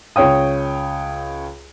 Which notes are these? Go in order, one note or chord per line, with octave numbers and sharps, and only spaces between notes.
C#2 C#5 G5 D#6